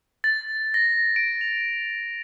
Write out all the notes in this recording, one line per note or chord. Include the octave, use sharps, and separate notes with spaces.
A6
A#6
D7
F7